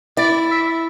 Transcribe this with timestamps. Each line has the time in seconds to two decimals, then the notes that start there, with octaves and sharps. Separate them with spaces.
0.17 E4 D5
0.51 E5